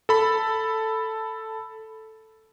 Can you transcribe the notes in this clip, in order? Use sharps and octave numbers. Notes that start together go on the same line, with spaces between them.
A4 B5